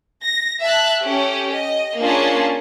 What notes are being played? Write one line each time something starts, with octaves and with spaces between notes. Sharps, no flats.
A#6
E5 A5 F#6
C#4 G4 A4
D#5
A#3 C#4 D4 F4 G#4 A5